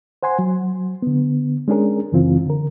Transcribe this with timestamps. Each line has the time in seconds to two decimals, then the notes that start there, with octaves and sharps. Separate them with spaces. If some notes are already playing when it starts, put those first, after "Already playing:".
0.23 C5 F#5 G#5 C6
0.39 F#3
1.02 D3 B3
1.68 G#3 C#4 D4 G#4 A#4
2.12 F#2 C#3 E3 C4 F4
2.46 D3 A#4